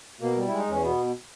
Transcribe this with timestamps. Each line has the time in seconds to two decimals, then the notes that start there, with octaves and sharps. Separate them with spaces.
0.21 B2 A#3
0.36 G3
0.47 G#3 E4
0.58 D#4
0.68 E2 C#4
0.83 B2 B3